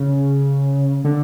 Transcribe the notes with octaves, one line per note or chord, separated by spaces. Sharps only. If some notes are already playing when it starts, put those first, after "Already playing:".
Already playing: C#3
D3